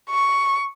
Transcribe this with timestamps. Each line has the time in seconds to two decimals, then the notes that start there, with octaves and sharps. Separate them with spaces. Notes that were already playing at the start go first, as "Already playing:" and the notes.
0.10 C#6